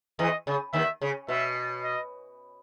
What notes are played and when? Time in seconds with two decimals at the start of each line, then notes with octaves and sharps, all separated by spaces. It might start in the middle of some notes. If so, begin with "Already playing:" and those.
0.19 E2 E3 D#5
0.47 C#3
0.73 D#2 D#3 E5
1.02 C#3
1.28 B2 E5
1.84 D#5